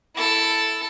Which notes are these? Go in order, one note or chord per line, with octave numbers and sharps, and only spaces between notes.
E4 A4